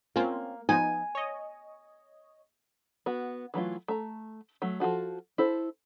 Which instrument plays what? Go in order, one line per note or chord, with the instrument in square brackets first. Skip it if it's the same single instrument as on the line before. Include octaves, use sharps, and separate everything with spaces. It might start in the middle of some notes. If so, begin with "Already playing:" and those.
[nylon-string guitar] A#3 [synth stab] C4 C#4 F4
[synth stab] F3 B3 D#4 [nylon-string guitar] G#5
[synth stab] C#5 D#5
[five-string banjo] B3 F#4
E3 F#3 A3 F4
A3 A#5
F#3 A3
F3 F4 F#4 A4
E4 A4 C5